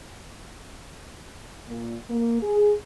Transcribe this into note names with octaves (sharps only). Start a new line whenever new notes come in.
A#2
A#3
G#4